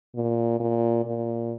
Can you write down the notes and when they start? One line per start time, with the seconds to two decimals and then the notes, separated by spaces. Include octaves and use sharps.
0.15 A#2
0.60 A#2
1.06 A#2